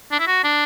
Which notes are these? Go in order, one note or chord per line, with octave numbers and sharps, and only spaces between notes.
D4
E4
F#4
D4